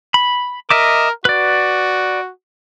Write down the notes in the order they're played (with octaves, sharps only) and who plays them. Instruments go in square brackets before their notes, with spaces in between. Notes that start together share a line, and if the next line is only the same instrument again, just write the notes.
[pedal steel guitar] B5
[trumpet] A#4 [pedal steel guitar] D#5 E5 D6
[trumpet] F#4 [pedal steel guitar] B4 D5